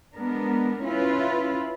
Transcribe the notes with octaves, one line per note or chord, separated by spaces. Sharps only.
G#3 B3 D4 A#4
C#4 E4 F4 B4